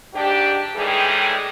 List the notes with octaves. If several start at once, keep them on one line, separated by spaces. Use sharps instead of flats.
G#2 D4 G4
A2 D#3 E3 G3 G#3 G#4